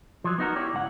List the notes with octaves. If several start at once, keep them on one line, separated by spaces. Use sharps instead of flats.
F3 F#3
B3 D#4 F#4 A#4
E4 G4 C#5 D5
C#2 G2 E4 F#5